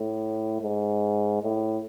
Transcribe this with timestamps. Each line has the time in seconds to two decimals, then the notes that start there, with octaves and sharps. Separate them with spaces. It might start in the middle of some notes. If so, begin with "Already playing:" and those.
Already playing: A2
0.61 G#2
1.43 A2